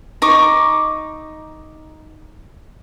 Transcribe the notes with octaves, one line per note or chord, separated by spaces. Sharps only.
D#4 C#6 D6